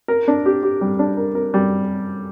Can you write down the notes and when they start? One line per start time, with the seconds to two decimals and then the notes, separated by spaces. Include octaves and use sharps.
0.08 A#4
0.28 D4
0.46 G4
0.63 G4
0.81 G3
0.99 D4
1.17 A#4
1.35 A#4
1.54 G3